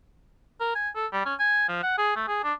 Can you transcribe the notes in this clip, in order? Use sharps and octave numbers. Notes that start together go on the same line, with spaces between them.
A#4
G#5
A4
G3
C#4
G#5
F3
F#5
G#4
A3
G#4
D4